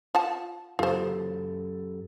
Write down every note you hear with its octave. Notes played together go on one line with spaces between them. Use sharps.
F4 F#5 A5
F#2 F4 G4 A4 C5